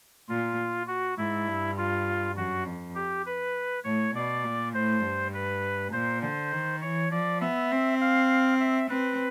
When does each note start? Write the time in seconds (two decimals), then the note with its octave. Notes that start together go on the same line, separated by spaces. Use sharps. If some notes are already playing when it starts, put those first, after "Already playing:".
0.29 A#2 F4
0.88 F#4
1.17 G#2 E4
1.47 G2
1.78 F4
2.36 F#2 F#4
2.66 F2
2.95 G4
3.26 B4
3.84 A2 C#5
4.14 B2 D5
4.44 A#2
4.73 A2 C5
5.04 G2
5.34 B4
5.92 A#2 C5
6.22 D3 C5
6.52 D#3
6.81 E3 C#5
7.11 F3 D5
7.41 B3 E5
7.71 C4
8.01 F5
8.60 E5
8.90 C4 B4